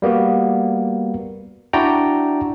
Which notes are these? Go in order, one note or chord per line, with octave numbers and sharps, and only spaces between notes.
G3 A#3 B3 F#4
D4 E4 F#4 D5 G5 A#5